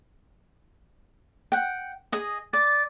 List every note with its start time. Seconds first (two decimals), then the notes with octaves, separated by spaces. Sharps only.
1.52 F#5 G5
2.12 G#4 D#5
2.53 D5 A6